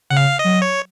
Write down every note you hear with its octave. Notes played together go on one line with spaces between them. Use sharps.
C#3 F#5
F5
D#5
F#3
C#5